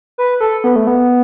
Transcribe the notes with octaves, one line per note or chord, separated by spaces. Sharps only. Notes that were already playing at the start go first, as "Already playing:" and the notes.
B4
A4
B3
A3
B3